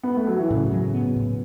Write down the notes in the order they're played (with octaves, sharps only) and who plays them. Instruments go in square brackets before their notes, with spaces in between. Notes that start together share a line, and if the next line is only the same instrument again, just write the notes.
[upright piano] B3
A3
F#3
E3
[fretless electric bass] A2 [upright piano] C#3
[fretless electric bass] F#3
B3
A2